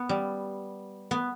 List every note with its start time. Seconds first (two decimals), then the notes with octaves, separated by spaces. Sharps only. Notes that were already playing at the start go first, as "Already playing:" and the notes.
Already playing: B3
0.09 G3
1.11 B3